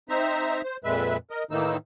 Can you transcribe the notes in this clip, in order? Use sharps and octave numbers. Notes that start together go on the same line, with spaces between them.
C4 D#4 C5 E5 A#5
C5
F2 A#2 G#3 B4 E5
A#4 D#5
A2 D#3 E3 A#3 D#4 E6